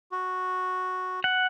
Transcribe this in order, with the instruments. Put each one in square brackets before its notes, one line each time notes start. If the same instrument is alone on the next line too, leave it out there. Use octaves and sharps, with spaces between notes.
[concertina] F#4
[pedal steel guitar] F#5